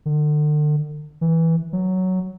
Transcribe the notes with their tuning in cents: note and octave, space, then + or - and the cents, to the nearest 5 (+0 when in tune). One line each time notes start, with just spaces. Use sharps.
D3 +40
E3 -10
F#3 +5